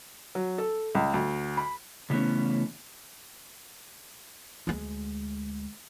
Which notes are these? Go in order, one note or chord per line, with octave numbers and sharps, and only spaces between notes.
F#3
A4
C#2
D2
B5
C#3 E3 A3 B3 C#4
D2 G#3